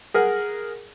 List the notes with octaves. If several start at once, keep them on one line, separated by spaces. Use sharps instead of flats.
G#4 A#4 F#5